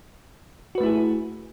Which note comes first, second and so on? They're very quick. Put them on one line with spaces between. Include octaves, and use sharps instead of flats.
F#4 B4 A3 E4 G#4